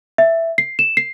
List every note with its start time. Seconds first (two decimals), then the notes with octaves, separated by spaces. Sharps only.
0.18 E5
0.58 C7
0.79 E7
0.97 C7